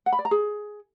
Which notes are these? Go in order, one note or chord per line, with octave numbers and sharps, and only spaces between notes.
F#5
B5
D5
A#5
G#4